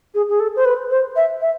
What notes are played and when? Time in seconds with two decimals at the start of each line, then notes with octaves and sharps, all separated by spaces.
0.14 G#4
0.29 G#4
0.40 A4
0.56 C5
0.65 B4
0.90 C5
1.16 E5
1.41 E5